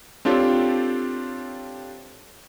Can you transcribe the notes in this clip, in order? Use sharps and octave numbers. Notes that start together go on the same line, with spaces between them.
C4 D4 F4 G4 A4 C#5